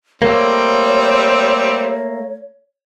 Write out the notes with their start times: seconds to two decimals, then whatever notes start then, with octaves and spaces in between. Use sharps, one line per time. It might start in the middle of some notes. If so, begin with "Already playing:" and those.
0.22 G3 A3 A#3 C4 C#5